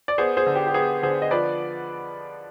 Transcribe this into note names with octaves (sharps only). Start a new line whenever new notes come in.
D5
B3 G#4 C5
G#4 C5
D3
G4
G4
B3 G#4
D3 G#4 C5
D#5
F3 B4 D5